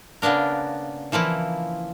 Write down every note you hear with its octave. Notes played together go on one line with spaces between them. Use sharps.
C#3 A#3 B3 D4 A#4
E3 F3 A#3 E4